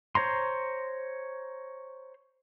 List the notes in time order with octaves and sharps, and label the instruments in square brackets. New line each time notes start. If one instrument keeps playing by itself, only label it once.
[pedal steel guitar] C5 C#5 A#5 C6